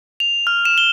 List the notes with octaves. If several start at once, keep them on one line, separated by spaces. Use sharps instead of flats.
F7
F6
E7
G7